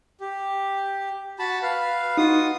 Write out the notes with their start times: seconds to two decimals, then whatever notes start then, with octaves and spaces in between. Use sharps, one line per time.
0.20 G4
1.39 F#4 A5 B5
1.63 B4 F5
2.18 D#4 F4 F#4 D#6